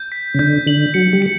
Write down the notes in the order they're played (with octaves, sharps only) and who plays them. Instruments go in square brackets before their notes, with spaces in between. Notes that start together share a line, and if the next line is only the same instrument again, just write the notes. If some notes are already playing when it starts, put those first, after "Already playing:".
Already playing: [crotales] G6
B6
[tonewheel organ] C#3
[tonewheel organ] D3 [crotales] G6
[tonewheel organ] D3 [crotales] F#7
[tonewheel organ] F#3 [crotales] C#7
[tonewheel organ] G3
[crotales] C#7